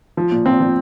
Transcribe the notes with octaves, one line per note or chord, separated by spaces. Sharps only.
F3
A#2
F3 C4
F3